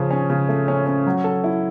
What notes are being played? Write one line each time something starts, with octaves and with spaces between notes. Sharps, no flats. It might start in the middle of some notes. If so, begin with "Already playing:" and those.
Already playing: C#3 F3 C#4
C#4
C#3
A3
C#4
C#4
F#3
A4
E4